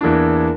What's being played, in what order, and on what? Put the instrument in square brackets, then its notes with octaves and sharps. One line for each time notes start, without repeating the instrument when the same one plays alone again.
[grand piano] E2 E3 A#3 D4